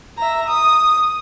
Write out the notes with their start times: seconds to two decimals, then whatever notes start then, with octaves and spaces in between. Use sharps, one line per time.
0.18 E5 A#5
0.48 D#6